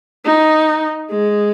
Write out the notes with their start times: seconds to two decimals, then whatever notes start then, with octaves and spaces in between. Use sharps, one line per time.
0.25 D#4
1.10 G#3